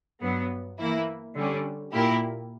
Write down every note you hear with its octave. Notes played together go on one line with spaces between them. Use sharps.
G2 F#3 B3
E3 A#3 E4
D3 G3 C#4
A#2 A#3 E4 G4